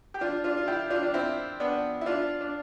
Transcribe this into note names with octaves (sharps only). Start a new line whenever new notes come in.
G4
D4 F4
D4 F4
F4
E4 G4
D4 F4
D4
C4 E4
B3 D4
E4
D4 F4
D4